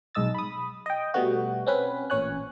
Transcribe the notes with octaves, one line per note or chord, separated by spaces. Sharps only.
B1 G#2 D#5 E6 A6
B5 D#6
D#5 G5
B2 G3 A3 B3 F#4
C4 C#4 B4
A1 A#2 C#4 C#5 G#5 F#6